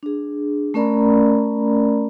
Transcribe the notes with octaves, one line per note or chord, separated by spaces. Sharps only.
D4 G#4
A3 C#4 A#4 D5 A#5 B5